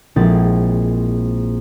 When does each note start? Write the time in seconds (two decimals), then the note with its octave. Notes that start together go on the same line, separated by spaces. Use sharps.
0.16 A#1 G#3 C4 E4 A6